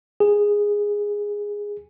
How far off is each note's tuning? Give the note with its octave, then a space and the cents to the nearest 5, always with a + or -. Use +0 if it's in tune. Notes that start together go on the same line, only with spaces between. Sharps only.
G#4 -10